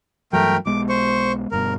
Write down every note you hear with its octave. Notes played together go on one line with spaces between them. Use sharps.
G2 E3 F#3 A3 A#4 G5
B1 G#3 B3 D6
C5 C#6
G1 G2 B2 A#4